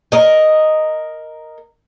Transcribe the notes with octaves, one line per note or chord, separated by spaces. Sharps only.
A#4 D#5